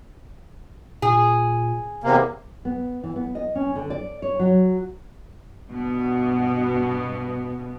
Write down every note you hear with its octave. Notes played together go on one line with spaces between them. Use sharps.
A#2 G#4
E2 C3 A#3
B3
E3
B3
D#5
C#4
D3
D5
C#5
F#3
G2 B2 B3